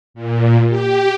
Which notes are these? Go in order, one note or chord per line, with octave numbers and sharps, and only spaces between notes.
A#2
G4